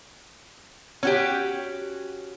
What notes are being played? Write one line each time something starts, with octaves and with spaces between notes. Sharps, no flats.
C#4 F#4 G4